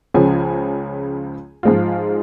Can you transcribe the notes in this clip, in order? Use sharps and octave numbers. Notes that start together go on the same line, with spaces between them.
C#2 C#3 F3 C#4 G#5
G#2 F3 G#3 F4